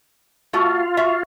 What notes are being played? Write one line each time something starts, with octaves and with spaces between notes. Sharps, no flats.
A3 F4 F#4
F#4 E5